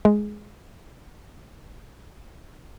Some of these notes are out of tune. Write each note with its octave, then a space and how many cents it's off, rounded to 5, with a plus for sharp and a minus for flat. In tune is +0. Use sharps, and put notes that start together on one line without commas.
G#3 +10